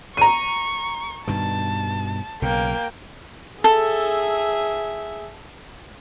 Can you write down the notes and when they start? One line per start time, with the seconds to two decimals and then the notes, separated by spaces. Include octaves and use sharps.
0.17 A#5 C#6 D#7
1.28 G2 B2 D#3 A5
2.42 B1 C#3 A#3 G5
3.64 G#4 A4 E5